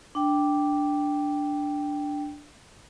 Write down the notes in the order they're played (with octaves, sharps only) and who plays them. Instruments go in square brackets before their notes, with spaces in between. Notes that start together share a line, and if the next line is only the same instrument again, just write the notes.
[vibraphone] D4 G5